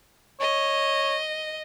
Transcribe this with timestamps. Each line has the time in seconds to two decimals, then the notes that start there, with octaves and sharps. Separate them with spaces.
0.40 C#5 D#5